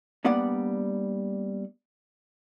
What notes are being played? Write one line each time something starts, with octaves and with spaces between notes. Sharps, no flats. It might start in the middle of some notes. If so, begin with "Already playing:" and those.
G3 A#3 B3 D4 D5 F#5